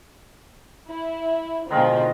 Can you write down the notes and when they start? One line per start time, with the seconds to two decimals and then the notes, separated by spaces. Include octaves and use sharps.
0.90 E4
1.71 B2 D3 D#3 F3 G#3 A#4